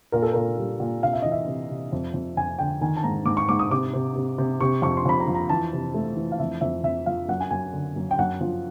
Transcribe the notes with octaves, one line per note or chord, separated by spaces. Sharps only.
A#2 A#4
A4
A#2 A#4
G3
A#2
C3 F5
E5
E3 D#5
E5
C3
C3
F2
F2
F2 G#5
D3 G5
D#3 G#5
A5
G#2 A#5
G#2 D6
C#6
G#2 D6
D#6
C3 D6
C3
C3
C3
C3 C#6
F2 C#6
C6
F2 B5
A#5
F3
A#5
E3 A5
C3
A3
E3
F5
F2 E5
F2 E5
F2 E5
F3 F5
F#2 F#5
G#5
F#2 G#5
D3
F#2
G5
F#2 F#5
F3